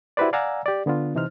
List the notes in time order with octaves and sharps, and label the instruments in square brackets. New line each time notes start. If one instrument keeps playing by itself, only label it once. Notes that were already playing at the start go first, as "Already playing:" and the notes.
[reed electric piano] E4 F#4 G4 B4 C5 D5
D5 F5 F#5 G#5 A#5 E6
G4 D5
D3 B3 D4 F4
C3 E3 D#4 C5 F6